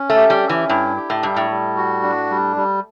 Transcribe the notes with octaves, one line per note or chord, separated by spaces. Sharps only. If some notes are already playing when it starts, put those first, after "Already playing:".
Already playing: C#4
A3
G4
G3
C#4
E3
G2 E4
G4
A2
G2 G3
A2
G3
F#4
D4
G3
G3